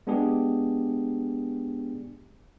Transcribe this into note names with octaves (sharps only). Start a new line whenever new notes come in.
G#3 B3 D4 G4 G#4